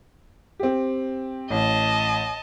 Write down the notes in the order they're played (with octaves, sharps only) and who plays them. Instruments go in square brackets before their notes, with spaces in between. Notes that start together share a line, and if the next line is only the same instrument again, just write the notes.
[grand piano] C4 G4
[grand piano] A1 [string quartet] D#5 A5